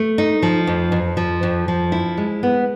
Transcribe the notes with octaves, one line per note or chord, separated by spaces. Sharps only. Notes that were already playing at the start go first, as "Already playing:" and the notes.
Already playing: A3
D#4
F3
F2
F2
F3
F2
F3
E4
G#3
B3